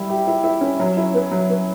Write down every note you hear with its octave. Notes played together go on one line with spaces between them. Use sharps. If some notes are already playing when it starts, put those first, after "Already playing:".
Already playing: G3 E4
G4
E4
E4
C#4
F#3
E4
B3
F#3
B3